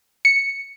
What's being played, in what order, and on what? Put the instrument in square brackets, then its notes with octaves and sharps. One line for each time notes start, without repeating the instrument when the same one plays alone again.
[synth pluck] C#7